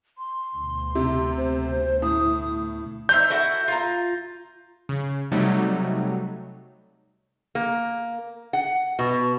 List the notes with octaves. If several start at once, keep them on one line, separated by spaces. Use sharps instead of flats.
C6
D2 B2
C3
C5
A2 D#6
D#4 C5 E5 G6
E4 F#4 A4
F4 A#5
C#3
C3 F#3 G3 A3 D#4
A#3
F#5
B2